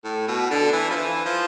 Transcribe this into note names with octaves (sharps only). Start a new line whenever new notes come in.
A2
B2
D3
E3
F3
E3
F3